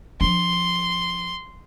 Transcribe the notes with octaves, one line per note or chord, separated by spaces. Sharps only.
F3 D4 C6